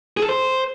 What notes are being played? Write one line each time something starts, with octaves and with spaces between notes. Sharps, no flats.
G#4
A4
C5